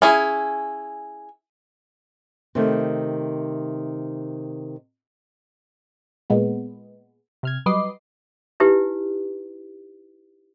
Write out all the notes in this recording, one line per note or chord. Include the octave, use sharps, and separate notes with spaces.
C#4 E4 G#4
C3 D#3 A3
A#2 G#3 B3
C3 F6 G#6
F#3 G3 B4 D#5 D6 C7
D#4 E4 G4 B4